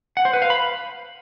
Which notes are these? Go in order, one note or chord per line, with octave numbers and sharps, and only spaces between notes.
F#5
C5
B4
F5
B5